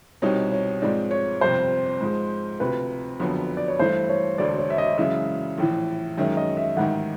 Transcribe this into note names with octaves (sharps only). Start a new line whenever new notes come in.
C2 B2 G3 C4 D#4 C#5
C#5
G#2 F3 G#3 C4 D5
C#5
G1 F2 C3 C5
G#2 F3 G#3
D2 C3 F3 B4
F#1 F2 D3 F#3 B3
D5
C#5
G2 E3 A3 C5
C#5
E1 D2 D3 D5
C#5
E5
D#5
F#2 C#3 E3 G#3 E5
A#1 A2 E3
F#2 D#3 G#3 C#4 E5
D#5
E5
A1 G#2 D#3 F#5